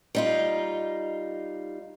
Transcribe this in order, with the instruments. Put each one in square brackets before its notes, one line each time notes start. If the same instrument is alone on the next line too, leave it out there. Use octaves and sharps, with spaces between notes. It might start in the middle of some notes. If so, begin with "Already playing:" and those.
[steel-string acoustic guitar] G3 D#4 F4